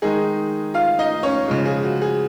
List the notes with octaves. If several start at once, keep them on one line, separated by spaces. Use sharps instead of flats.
D#3 G#3 D#4 G#4
F4 F5
D#4 D#5
C#4 C#5
C#3 F3 G#3
G#4
F#4
G#4